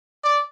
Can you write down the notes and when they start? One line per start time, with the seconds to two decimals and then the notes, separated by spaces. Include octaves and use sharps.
0.24 D5